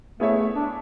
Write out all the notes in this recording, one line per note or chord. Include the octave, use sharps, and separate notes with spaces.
A3 B3 E4 G#4 C#5 E5
A3
D4